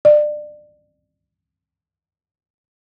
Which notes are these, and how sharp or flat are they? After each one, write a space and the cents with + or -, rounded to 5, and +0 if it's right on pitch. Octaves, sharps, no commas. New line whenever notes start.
D5 +25